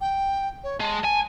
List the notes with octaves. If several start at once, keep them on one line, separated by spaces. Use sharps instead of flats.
G5
C#5
G#3 A5
G#5